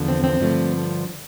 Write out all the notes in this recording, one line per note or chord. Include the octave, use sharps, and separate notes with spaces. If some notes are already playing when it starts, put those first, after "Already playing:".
Already playing: E2 D3 F3
C4
C4
G2 D3 F3 A3